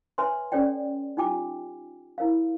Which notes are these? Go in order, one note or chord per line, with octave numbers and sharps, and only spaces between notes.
B4 C#5 E5 G#5 C6
C#4 A4 C#5 D5 G5
D#4 F4 G4 G5 G#5 D6
E4 A#4 C#5 F5